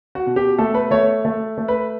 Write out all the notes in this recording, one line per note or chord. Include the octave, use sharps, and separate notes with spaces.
F#4
B2
G4
A3 A4
B4
A3 C#5
A3
A3
B4